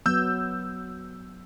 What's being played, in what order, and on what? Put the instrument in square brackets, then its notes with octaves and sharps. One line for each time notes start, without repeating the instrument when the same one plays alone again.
[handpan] F#3 B3 [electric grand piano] E6 G6